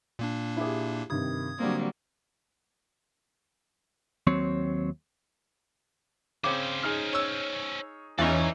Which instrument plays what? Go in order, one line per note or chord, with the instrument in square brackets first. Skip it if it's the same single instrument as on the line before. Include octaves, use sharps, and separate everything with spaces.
[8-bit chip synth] A#2 A#3 D4
[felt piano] E4 G4 G#4
[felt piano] G2 C3 D#3 [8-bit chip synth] D#6 G#6
[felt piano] D3 C4 [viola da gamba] F#3 G3 A#3
[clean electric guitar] D#2 F#3 C4 C#5
[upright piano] C#3 C4 [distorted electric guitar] C#4 C5 [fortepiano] D6
[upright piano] D#4 G#4 F6
[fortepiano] C#5 E6
[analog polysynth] E2 C#4 [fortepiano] E3 D#4 [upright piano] F4 [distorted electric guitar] D5 A#5